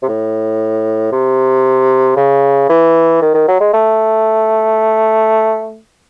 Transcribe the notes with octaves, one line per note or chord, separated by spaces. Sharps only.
C3
A2
C3
C#3
E3
D#3
D#3
F#3
G#3
A3